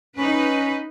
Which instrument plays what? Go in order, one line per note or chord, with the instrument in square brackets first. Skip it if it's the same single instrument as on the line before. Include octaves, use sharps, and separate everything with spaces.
[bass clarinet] C#4 [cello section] D#4 B4